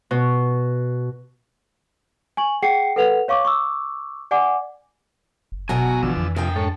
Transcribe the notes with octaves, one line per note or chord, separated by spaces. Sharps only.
B2
G#5 C#6 F#7
G#4 F#5 G5 C7 C#7
A4 B4 F#5 F7
C#5 F5 C#6 D6
C#6 D6 E6
D5 F#5 G#5 D6
F#1
B2 F#3 F#4 G#5 A#5
A1 D3 E3 F3 E6
F2
C3 F3 D4 G#4 A#4 G5
G#2 A4 C#5